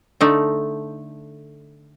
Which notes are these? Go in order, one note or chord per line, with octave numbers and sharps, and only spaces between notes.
D3 A3 D#4